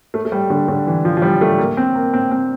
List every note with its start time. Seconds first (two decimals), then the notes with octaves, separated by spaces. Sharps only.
0.14 A3
0.25 A3
0.32 G3
0.50 D3
0.68 D3
0.87 E3
1.05 F3
1.17 F3
1.22 G3
1.41 A3
1.59 A#3
1.77 C4
1.95 A#3
2.14 C4
2.31 C4